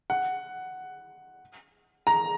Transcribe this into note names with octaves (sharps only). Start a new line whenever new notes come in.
F#5
A#5